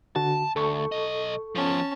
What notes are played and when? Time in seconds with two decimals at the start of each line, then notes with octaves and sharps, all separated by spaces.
0.16 D3 F#4 A5
0.56 D2 A4 C#6
0.92 B1 D#5
1.55 F3 B3 C#4 A5